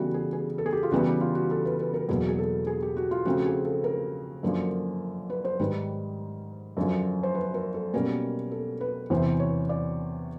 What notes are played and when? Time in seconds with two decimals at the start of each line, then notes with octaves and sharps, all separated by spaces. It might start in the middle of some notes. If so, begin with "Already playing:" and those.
Already playing: C#3 E3 G3 B3 F#4 A4
0.14 G#4
0.33 G#4
0.58 A4
0.66 G#4
0.73 G4
0.83 F4
0.92 C#3 E3 G3 B3 F#4
1.06 G4
1.21 F4
1.35 F#4
1.51 A4
1.65 B4
1.80 B4
1.94 A#4
2.09 E2 B2 F#3 A#3 G#4
2.28 G#4
2.39 A4
2.67 G#4
2.82 G4
2.97 F#4
3.11 F4
3.25 C#3 F3 A3 C4 F#4
3.45 G#4
3.65 A4
3.84 A#4
4.43 F#2 D3 F3 A#3
5.30 B4
5.45 C5
5.60 G#2 D#3 G3 B4
6.77 F#2 D3 F3
7.23 C5
7.35 B4
7.54 A#4
7.74 A4
7.94 B2 G3 A#3 C#4 A#4
8.51 A4
8.81 B4
9.10 E2 C3 E3 C5
9.40 C#5
9.69 D5